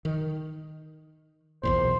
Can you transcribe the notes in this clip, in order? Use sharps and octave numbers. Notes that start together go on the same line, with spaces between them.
D#3
B1 E2 A#2 C5